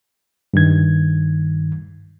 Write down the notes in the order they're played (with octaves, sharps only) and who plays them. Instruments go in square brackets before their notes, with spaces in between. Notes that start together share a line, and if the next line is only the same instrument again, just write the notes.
[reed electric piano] G2 D#3 G#6